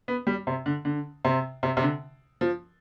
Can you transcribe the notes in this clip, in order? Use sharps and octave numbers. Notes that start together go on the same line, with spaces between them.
B3
G3
C3
D3
D3
C3
C3
C3
D3
F3